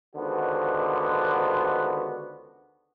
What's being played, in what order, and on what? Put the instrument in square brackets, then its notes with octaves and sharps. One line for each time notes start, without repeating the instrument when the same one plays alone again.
[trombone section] C#2 D3 D#3 B3 F#4 C5